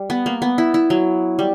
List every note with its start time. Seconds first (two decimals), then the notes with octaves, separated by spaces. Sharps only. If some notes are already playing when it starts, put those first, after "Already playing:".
Already playing: G3
0.10 B3
0.26 A#3
0.42 B3
0.58 E4
0.74 E4
0.90 F#3
1.39 G3